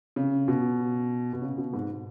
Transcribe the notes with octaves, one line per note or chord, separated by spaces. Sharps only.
C#3
B2
B2
C#3
B2
G#2